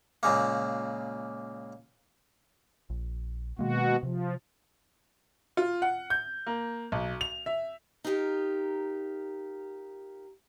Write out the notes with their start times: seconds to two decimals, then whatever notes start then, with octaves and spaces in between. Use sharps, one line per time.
0.23 C#2 A#2 C#3 A#3
2.90 A#1
3.59 B2 D#3 G#3 A#3 F#4
4.03 C3 F3
5.57 F4
5.82 F#5
6.10 G6
6.46 A#3
6.92 B1
7.21 F7
7.46 E5
8.04 D#4 F4 G4 A#4